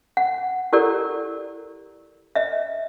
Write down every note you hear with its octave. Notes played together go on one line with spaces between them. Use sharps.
F#5
E4 G4 A4 A#4 D5
D#5 E5